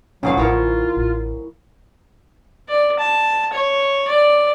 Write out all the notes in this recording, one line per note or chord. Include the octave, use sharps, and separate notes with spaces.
F1 D2 F#3 C#4 F5
A1 E4 F4 A#4 C#5
A1
D5
A5
C#5
D5